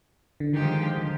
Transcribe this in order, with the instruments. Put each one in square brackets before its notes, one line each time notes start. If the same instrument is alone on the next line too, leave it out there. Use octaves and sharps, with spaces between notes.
[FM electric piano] D3
[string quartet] G2 F3 G#3 D#4 G4 [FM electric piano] D#3
[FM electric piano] D3